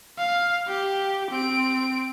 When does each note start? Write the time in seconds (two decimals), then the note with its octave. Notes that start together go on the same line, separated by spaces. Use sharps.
0.18 F5
0.68 G4
1.30 C4 D7